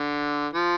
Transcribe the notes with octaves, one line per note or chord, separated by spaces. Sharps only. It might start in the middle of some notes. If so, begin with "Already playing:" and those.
Already playing: D3
F3